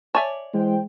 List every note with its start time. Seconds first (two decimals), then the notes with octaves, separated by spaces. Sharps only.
0.15 C#5 D5 E5 G#5 A5
0.54 E3 G#3 C5 G5